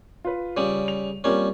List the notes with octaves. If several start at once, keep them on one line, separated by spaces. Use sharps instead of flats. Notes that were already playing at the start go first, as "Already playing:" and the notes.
F4 B4
C#3 G3
F7
G3 A#3 C4 C#4 F4